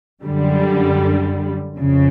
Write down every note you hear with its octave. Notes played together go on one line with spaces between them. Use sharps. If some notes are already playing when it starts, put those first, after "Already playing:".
F#2 D3 G3
F2 C#3